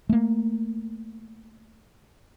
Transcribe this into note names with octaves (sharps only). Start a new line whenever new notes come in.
A3 A#3